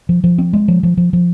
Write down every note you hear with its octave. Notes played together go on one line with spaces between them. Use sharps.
F3
F3
C4
G#3
F3
F3
F3
F3